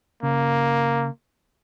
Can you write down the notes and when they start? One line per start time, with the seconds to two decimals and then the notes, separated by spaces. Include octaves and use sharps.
0.23 C#3 A#3